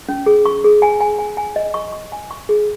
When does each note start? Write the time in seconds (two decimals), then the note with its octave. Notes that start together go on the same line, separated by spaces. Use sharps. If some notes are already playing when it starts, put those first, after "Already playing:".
0.09 C#4
0.26 G#4
0.46 C#6
0.64 G#4
0.82 G#5
1.01 G#5
1.19 G#5
1.37 G#5
1.56 D#5
1.74 C#6
1.93 C#6
2.12 G#5
2.31 C#6
2.49 G#4